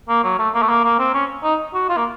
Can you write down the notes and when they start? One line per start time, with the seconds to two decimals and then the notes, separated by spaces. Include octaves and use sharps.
0.09 A#3
0.24 F#3
0.39 A3
0.55 A#3
0.63 A3
0.69 A#3
0.84 A#3
0.99 C4
1.14 C#4
1.44 D#4
1.74 F#4
1.89 F4
1.97 A#3